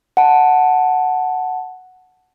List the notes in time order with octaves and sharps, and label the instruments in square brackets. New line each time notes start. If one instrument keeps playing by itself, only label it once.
[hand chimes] F#5 A5